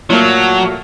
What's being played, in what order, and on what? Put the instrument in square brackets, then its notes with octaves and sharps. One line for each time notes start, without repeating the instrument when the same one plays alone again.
[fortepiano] A#2 A3 A#3 [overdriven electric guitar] F#3